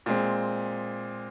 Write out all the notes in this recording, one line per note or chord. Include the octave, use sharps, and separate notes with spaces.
A#2 G#3 C4